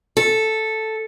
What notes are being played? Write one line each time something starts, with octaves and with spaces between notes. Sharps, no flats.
A4